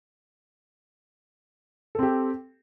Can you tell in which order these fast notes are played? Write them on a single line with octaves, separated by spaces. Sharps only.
A4 C4 G4